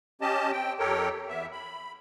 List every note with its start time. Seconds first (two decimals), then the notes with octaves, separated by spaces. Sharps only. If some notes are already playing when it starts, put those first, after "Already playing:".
0.21 C#4 G4 D#5 A5
0.52 C4 G5
0.79 F2 G4 A4 A#4 C#5 G5
1.29 E2 B3 E5
1.52 B5